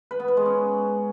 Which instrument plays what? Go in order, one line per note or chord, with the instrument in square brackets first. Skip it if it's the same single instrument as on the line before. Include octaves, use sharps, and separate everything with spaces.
[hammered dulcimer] B4
B3
B4
G#3
C#4